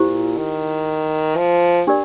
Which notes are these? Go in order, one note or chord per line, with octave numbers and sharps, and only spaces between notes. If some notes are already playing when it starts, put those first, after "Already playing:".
Already playing: A#2 E4 G4 C5
D#3
F3
D4 G4 A#4 D5